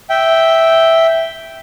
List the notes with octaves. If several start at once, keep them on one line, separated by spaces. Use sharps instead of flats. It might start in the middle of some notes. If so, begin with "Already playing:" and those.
E5 G5